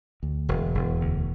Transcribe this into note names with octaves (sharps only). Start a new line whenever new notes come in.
D2
E1
E1
D2